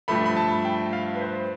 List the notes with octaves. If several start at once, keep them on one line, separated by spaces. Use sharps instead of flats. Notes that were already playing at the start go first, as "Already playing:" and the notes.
G2 F3 A3 B5
B5
A5
G5
F5
B4
C5